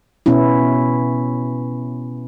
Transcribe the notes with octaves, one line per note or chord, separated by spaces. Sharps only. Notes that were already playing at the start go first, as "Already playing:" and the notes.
B2 B3 C#4 E4